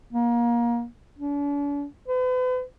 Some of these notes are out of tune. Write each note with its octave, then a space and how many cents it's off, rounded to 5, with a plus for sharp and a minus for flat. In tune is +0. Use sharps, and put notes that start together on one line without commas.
A#3 +25
D4 -45
B4 +40